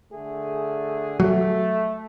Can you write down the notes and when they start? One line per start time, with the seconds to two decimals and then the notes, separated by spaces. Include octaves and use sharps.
0.12 D3 A3 G#4
1.20 F#3 A3